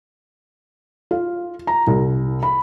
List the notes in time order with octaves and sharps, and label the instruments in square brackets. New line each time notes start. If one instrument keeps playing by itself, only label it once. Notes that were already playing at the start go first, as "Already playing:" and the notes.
[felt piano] F4
A#5
C2
B5